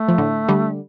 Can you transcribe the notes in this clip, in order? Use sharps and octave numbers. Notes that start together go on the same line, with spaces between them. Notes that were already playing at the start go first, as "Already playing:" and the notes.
Already playing: A3
F3
A2 D3
D3 G3